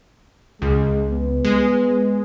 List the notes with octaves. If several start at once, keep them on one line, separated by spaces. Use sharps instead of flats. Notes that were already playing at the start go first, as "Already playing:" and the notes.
C#2 G#3
B3
G#3